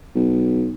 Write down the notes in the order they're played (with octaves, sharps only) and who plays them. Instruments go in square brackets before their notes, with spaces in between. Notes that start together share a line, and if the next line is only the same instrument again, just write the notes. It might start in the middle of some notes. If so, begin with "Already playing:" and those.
[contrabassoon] B1